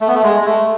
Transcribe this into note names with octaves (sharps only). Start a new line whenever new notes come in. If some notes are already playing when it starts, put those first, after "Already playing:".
A3
B3
A3
G#3
G#3
A3